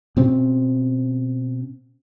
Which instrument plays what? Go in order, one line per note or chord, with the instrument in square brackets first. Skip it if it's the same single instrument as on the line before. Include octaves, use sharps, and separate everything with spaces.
[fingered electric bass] B2 C4 C#4